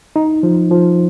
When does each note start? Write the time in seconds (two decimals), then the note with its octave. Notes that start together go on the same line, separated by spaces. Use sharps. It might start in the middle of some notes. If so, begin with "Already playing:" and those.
0.16 D#4
0.43 F3
0.71 F3